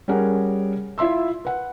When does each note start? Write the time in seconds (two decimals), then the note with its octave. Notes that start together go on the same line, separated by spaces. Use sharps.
0.08 G3 C#4 G#4 A#4 F#5
0.98 E4 F4 E5 C6 E6
1.45 B4 F#5